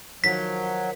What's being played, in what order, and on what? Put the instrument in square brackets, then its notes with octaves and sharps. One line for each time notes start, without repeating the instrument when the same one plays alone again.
[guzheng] D#3 F3 [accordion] F#3 [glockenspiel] B6